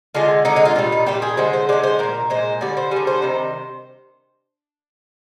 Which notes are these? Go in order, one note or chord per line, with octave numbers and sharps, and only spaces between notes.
D3 G#3 F4
D3 G#3 D#4
D#4
F4
A#2 G3 F4
D#4
A#2 G3 G4
G#4
D3 G#3 C5
C5
D3 G#3 D5
C5
A#2 G#3 A#4
A#2 G#3 C5
D3 G3 D5
C5
D3 G3 G#4
C5
C3 D#3 G3